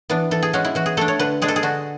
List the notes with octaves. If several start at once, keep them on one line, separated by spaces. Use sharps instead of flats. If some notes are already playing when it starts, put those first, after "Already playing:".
E3 B3 D4
E3 A4
G#4
G#3 C#4 F#4
E4
E3 F#4
G#4
A3 D4 A4
C#5
D3 B4
G#3 D4 G#4
A4
G#4
D3 F#4